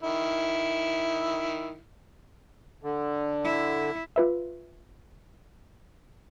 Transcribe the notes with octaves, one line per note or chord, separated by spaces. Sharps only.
D#3 E4
D3
E4
F4 B4 E5